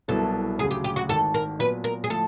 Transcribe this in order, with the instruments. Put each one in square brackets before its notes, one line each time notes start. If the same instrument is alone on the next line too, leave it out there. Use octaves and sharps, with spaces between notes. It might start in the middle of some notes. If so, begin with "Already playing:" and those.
[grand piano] C2 B2 F#3 B3 E4 [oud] A4
[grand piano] D2 C#3 F#3 [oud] G#4
[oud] G4
G4
F#4
[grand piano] G#1 G#2 D#3 [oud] A4
[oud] A#4
[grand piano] A#2 F#3 B3 [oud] B4
[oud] A#4
G#4
[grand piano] A2 F3 A3 [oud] A4